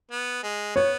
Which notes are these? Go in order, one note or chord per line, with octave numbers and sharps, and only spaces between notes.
B3
G#3
B3 C#5